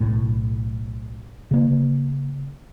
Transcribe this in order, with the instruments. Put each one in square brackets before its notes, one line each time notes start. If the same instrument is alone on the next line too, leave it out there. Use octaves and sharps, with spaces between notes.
[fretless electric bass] B1 A2
C#3 A#3